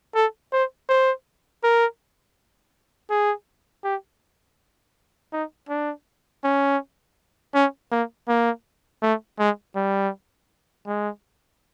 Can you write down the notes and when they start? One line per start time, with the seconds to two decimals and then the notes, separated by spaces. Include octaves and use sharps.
0.15 A4
0.53 C5
0.89 C5
1.64 A#4
3.10 G#4
3.84 G4
5.33 D#4
5.69 D4
6.44 C#4
7.55 C#4
7.92 A#3
8.29 A#3
9.03 A3
9.39 G#3
9.76 G3
10.87 G#3